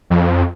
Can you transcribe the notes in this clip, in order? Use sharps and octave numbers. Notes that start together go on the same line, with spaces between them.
F2